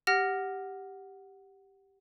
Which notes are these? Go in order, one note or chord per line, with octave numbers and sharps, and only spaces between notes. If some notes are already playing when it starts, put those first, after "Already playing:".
G4 F#5 F6 A#6